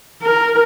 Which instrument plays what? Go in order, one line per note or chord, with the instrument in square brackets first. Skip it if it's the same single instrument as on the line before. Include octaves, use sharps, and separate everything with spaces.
[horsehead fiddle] A#4